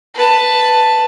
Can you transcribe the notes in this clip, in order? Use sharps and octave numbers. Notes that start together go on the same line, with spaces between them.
B4 A5